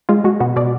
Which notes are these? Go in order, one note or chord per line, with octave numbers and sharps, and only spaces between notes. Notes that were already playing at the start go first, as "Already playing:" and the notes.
G#3 F4
G#3 F#4
B2 F#4
B2 D5